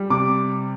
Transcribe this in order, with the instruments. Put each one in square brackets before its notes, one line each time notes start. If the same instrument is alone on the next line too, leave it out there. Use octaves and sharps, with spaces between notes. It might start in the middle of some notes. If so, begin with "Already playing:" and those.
Already playing: [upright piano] G3
[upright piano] C3 [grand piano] D6